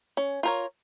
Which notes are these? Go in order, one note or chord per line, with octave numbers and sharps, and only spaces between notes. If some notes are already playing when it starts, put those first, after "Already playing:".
C#4
F4 A#4 C#5